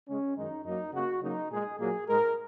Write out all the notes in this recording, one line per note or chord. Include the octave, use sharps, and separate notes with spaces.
C#3 G#3 C#4
F#2 D#3 G#3 D#4
F#2 F#3 A#3 D#4
C#3 A#3 F#4
C#3 F#3 A#3 D#4
A#2 G#3 G#4
A#2 F#3 A#3 G#4
G#2 G#3 A#4